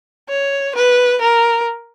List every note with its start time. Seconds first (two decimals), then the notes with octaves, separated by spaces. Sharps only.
0.29 C#5
0.75 B4
1.21 A#4